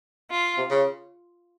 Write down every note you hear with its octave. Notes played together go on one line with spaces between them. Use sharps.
F4
C3
C#3